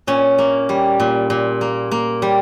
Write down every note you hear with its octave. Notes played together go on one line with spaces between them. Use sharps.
A#2 C#4
A#3
G3
A#2
A#2
A#3
A#3
G3